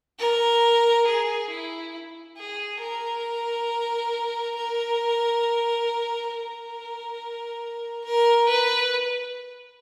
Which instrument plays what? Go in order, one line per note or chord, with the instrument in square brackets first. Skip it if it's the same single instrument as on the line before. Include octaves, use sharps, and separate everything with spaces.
[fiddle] A#4
G#4
E4
G#4
A#4
A#4
A#4
A#4
B4